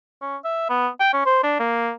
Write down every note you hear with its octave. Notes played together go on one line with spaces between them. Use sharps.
C#4
E5
B3
G5
C#4
C5
D4
A#3